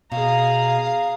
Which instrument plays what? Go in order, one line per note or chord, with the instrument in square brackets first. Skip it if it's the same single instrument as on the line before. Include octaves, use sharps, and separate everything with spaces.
[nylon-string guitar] B2 [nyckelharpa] G#4 A#5 [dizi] F5